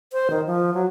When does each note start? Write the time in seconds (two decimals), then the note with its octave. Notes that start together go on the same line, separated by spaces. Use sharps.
0.13 C5
0.30 D#3
0.47 F3
0.74 F#3